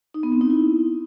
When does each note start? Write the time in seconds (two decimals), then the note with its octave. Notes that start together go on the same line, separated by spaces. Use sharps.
0.14 D#4
0.23 B3
0.32 C4
0.41 D#4
0.50 E4